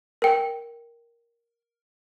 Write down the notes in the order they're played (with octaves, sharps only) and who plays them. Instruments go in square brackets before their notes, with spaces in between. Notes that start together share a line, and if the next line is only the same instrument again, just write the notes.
[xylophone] A#4 G5